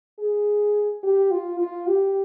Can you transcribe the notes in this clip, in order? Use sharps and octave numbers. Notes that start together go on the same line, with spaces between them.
G#4
G4
F4
F4
G4